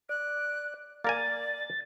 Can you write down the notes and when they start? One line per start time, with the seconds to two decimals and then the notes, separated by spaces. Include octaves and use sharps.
0.09 D5 F#6
1.04 A#3 A#4 D5 G#5 A6